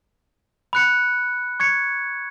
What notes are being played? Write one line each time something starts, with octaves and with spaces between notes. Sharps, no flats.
B5 F#6 C#7
C#6 G#6 C#7